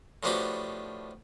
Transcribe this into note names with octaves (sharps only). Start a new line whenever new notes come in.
A2 F3 B3 D4 F#4 G4